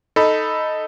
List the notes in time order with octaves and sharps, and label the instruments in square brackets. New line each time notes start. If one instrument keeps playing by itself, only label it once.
[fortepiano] D#4 [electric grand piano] A4 B5